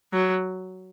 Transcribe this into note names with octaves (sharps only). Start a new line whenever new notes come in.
F#3